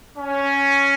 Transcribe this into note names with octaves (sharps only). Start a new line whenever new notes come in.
C#4